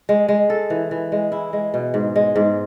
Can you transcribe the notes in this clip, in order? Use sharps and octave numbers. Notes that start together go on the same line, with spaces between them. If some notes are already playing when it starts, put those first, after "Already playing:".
G#3
G#3
A4
E3
E3
G#3
E4
G#3
B2
G#2
G#3
G#2